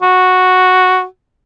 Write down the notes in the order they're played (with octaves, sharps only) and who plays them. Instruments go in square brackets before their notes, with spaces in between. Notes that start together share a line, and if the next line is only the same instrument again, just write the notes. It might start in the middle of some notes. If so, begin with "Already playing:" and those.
[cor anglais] F#4